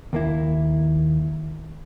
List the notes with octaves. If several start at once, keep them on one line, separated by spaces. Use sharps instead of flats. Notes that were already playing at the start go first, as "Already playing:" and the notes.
D#2 A#3 E4